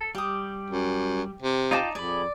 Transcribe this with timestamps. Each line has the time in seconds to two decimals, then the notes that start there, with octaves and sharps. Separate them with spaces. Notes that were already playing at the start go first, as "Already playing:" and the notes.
0.01 A4
0.15 G3 G4 D#6
0.70 F#2
1.42 C3
1.71 D#4 F4 D5 G5 A5 D6
1.95 F2 G#4 D5 B5